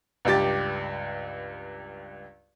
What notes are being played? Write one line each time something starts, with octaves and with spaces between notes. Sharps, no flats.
C#2 G2 G4 A6